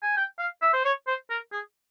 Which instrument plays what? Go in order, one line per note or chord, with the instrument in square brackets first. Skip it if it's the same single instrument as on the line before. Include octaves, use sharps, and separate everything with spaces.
[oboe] G#5
G5
F5
E5
C5
C#5
C5
A#4
G#4